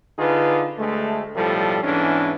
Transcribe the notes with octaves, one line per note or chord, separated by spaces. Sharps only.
D3 D#4 F4 G#4 B4
D2 G#3 A3
B1 A2 F3 G3 A4
E2 G#2 E3 C#4 D4